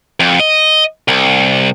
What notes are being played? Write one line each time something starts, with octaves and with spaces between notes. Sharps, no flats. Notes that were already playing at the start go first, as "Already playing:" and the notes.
F2
D#5
C2